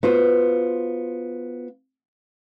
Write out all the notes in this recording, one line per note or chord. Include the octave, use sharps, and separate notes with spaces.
B3 F4 F#4 C5